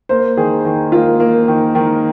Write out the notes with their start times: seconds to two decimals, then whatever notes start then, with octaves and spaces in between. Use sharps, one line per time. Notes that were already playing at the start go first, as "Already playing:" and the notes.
0.09 A#3 C5
0.37 D#3 G#4
0.65 D#3
0.92 A#3 F4
1.20 A#3
1.48 D#3
1.75 D#3